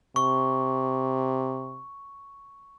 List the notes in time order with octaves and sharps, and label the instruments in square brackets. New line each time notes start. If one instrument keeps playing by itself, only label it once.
[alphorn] C3 [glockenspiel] C#6